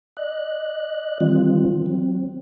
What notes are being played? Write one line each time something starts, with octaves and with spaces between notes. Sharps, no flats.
D5 D#5 F#6
D#3 E3 G3 C4 F4
F#3 C4